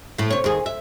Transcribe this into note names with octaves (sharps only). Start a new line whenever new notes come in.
A2 A3
C3 C#5
D#2 G#4
E5